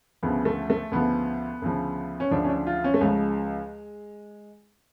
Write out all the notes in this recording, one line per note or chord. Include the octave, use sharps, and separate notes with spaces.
D2 C#3 F3 B3
A3
A3
D2 C#3 F3 B3
D2 C#3 F3
C#4
D2 C#3 F3 D4
C#4
D4
F4
C#4
A3
C#2 C#3 F3 G#3